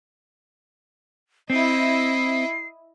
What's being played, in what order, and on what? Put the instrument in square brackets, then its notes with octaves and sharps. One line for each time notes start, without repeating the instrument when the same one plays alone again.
[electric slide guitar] C4 [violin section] E4 D#5 [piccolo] C7